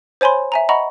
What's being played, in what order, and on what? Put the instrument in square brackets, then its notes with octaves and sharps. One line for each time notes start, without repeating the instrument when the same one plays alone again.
[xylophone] C5 C#5 G#5 B5 C6
E5 G#5 A#5
D#5 F#5 A#5 B5 C#6